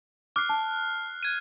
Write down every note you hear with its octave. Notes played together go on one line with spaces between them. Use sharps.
D6 F6 F#6 C7
A5
F#6 G#6 D#7